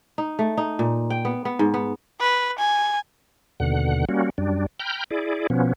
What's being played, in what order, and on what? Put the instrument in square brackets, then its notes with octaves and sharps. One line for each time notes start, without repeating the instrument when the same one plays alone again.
[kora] D#4
A3
D#4
A#2
G5
B3
B3
G#2
B3
[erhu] B4
G#5
[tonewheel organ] D#2 B2 D3 F#5
G3 A#3 C#4 F#4
F#2 G3 D4
G5 A#5 B5 F6 G6
E4 G#4 D5
B2 F3 B3 C#4